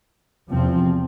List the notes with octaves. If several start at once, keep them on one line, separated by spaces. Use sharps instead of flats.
E2 C3 F3 C4